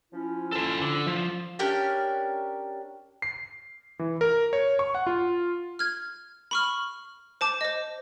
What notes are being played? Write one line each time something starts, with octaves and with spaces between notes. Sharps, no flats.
F3 C#4 E4
A4 C5
D3
F3
C#4 D4 G4 A#4
C7
E3
A#4
C#5
C#6
F#5
F4
F6 G#6
B5 C#6 F6
C5 A5 D6
C5 D#5